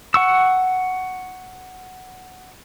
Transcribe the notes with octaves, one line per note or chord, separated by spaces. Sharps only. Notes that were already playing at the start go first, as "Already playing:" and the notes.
F#5 C#6 E6